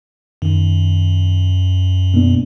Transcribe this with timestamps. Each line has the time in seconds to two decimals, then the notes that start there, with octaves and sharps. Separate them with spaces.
0.42 F#2 D#3
2.14 B2 A#3 D4